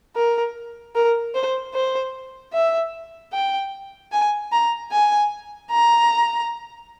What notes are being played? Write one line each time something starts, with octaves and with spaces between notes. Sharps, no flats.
A#4
A#4
C5
C5
E5
G5
G#5
A#5
G#5
A#5